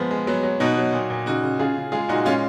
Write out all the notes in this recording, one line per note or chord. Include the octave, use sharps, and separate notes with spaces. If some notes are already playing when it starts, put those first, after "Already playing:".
Already playing: F3 G#3 B3
G#3
F#3 B3
F#3
B2 D#4 F#4
F#3
A#2
A#2
C#3 D#4 F#4
C#3
C#3 F4 G#4
C#3
G#3 F4 G#4
A#2 D#4 F#4
G#3 C#4 F4